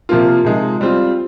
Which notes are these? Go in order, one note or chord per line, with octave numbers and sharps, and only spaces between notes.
C3 F3 A#3 F4
C3 F3 G#3 D#4
G3 C4 F4